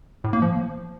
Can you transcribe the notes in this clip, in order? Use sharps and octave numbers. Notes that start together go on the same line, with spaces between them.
A2
A#3
F3